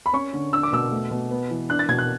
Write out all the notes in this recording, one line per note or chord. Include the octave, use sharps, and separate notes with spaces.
B5
C#4 C#6
D3
D4 E6
D6
B2 E6
A3
B2
B3
E3
D4 F#6
A6
B2 G#6
F#6